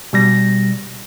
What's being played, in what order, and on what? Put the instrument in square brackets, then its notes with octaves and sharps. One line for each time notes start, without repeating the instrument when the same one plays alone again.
[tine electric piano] B2 G3 A#6